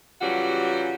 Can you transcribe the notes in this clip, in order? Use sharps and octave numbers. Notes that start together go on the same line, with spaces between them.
C#3 E3 F#3 G3 F4 F#4